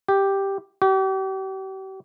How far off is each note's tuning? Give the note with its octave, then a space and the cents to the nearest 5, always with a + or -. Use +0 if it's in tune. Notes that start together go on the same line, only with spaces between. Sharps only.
G4 +0
G4 -40